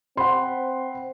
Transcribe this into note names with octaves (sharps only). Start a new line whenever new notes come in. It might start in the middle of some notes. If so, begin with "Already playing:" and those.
C4 F#5 B5 C6